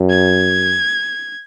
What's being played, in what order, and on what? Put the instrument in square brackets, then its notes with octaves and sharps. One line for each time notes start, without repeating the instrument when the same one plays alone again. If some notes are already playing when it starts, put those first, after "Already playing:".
Already playing: [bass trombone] F#2
[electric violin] G#6